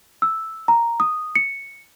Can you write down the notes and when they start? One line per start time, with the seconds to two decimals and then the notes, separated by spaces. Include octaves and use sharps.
0.22 E6
0.68 A#5
1.00 D#6
1.35 C#7